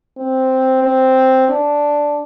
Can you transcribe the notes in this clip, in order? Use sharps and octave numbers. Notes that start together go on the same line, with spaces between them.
C4
C4
D4